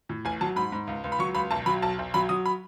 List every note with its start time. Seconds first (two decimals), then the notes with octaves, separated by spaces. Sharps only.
0.09 A2
0.25 A1 G#5
0.41 F#3 A5
0.56 G#2 B5
0.72 G#2
0.87 C#2
1.04 C#2
1.12 B5
1.19 F#3 C#6
1.35 C#2 B5
1.51 B1 A5
1.66 F#3 B5
1.82 B1 A5
1.99 B1
2.14 F#3 B5
2.29 F#3 D#6
2.46 B5